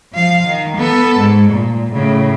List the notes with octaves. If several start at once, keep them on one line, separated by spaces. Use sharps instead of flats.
F3 F5
D#3
B3 A4
G#2
A#2
A2 C#3